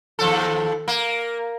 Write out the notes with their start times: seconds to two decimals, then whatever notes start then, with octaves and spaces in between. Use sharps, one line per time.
0.19 D#2 F3 A4
0.88 A#3